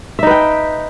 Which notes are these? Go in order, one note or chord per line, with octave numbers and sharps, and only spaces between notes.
D#4 B4 E5 G5